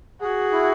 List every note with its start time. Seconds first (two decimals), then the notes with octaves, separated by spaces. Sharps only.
0.21 F#4 G#4
0.52 E4